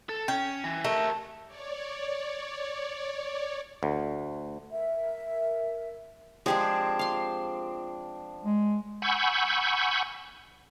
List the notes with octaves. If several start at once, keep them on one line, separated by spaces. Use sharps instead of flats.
A4
C#4 G5
E3
A3 G4 A#4
C#5 D5
D2
A#4 E5
F3 G#3 C4 D4 G4 G#4
F5 C6
G#3
F#5 G#5 B5 C#6 E6 G6